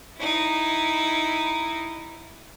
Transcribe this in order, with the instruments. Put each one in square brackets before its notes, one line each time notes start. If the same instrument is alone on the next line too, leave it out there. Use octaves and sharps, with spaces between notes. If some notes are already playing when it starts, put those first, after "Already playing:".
[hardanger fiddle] D#4 E4